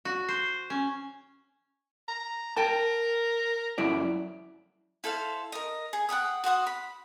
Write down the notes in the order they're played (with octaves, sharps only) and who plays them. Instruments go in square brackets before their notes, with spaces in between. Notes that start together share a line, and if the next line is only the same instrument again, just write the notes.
[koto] F#4
C5
C#4
[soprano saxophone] A#5
[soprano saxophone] A#4 [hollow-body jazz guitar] G5 A5
[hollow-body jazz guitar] F#2 E4 D5
[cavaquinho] E4 A4 C5 F5
A#4 D#5
G#4
F#5 G5 B5 D#6
F#4 C5 F#5 D#6
B5